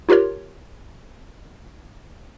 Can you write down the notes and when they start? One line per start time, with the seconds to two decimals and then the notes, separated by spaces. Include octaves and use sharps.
0.09 D#4 F4 G4 A#4 C#5